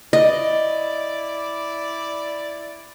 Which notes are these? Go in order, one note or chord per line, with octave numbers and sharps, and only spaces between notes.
E4 D5 D#5